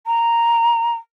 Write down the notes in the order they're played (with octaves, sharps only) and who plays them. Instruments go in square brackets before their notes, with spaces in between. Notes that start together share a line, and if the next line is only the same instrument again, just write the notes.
[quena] A#5